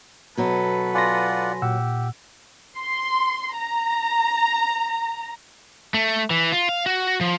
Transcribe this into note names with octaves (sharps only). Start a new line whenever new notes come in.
B2 F#3 A4 B4
F4 D5 F#5 G#5 C6 A#6
A#2 G4 F#5 E6
C6
A#5
A3
E3
F4
F5
F#4
F3